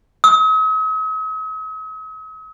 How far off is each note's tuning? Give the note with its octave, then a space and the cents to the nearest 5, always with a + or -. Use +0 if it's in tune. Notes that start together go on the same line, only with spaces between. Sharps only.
D#6 +45